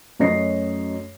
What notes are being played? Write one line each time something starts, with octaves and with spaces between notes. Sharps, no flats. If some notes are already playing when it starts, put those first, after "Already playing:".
F#2 A3 C#5 D#5 A#6 C7